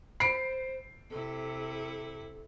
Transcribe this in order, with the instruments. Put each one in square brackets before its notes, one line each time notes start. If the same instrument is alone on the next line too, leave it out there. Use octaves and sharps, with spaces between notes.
[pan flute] C5 [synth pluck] B5 [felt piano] C7 D7
[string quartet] C3 E4 [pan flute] A4